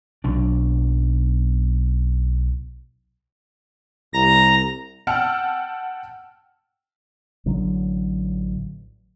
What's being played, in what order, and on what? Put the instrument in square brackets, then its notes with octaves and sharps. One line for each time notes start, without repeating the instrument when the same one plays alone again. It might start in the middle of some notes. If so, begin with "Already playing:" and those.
[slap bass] B1 F#3 D4
[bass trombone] C2 [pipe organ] A#5 A#6
[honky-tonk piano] F#5 G5 A5 E6 F6
[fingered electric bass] A1 D3 F#3